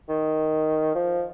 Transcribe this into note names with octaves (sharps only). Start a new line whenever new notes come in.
D#3
F3